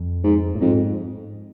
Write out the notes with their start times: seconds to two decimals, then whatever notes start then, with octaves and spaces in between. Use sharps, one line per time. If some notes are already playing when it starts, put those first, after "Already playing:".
Already playing: F2
0.24 G#2
0.55 A2
0.61 F2 G#2